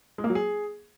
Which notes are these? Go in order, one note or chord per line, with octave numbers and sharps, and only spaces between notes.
G#3
A#3
F#3
G#4